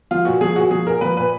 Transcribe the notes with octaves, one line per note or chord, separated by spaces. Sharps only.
F3 F4
A#2 F#4
F3 G#4
A#2 F#4
F3 G#4
A#2 A#4
F3 B4
A#2 B4